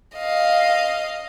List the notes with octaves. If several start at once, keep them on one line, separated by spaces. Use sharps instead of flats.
D#5 F5